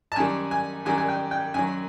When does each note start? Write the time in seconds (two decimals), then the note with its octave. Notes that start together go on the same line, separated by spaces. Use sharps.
0.12 A5
0.16 F#2 D#3 G3 G#5
0.51 G#5
0.85 F#2 D#3 G3 G#5
0.98 G#5
1.08 G5
1.31 G5
1.54 F#2 D#3 F#3 G#5